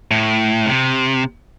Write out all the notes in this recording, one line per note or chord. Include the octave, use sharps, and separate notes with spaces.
A2
C3